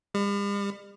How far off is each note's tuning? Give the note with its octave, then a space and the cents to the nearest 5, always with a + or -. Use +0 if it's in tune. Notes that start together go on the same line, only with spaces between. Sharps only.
G3 +45